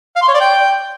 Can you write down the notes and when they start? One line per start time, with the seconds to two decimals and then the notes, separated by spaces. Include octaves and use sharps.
0.16 F5
0.22 C6
0.28 C#5
0.34 D5
0.40 G5